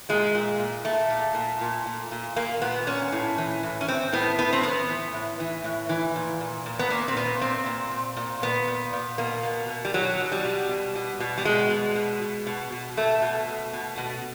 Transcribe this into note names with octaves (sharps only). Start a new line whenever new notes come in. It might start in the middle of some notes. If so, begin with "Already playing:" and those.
A#2 G#3
A#2
A#2
A#2 A3
A#2
A#2
A#2
A#2
A#2
A#2 A#3
A#2 B3
A#2 C#4
A2
E3
A2
C#4
A2 C4
A2 B3
A2 B3
C4
A2 B3
E3
A2
E3
A2
E3
A#2
A#2
A#2
B3
A#2 A#3
C4
A#2 B3
A#2 C4
A#2
A#2
A#2
A#2 B3
A#2
A#2
B2 A#3
B2
B2
G3
B2 F#3
B2
G3
B2
B2
B2
B2
G3
B2 G#3
B2
B2
B2
B2
B2
B2 A3
B2
B2
B2
B2